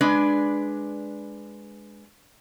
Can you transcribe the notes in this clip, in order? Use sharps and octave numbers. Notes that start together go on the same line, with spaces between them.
G#3 D4 B4